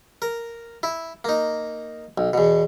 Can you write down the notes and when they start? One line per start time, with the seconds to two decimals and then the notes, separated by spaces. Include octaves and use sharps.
0.22 A#4
0.83 E4
1.25 A#3 D#4
2.18 B1
2.33 E2 B2